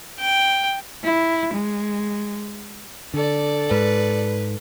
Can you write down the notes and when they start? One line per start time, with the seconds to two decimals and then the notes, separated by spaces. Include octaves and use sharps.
0.20 G5
1.04 E4
1.54 G#3
3.14 D3 A4 D5
3.71 G#2 B4